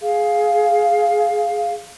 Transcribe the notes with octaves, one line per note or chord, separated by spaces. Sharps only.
G#4 F5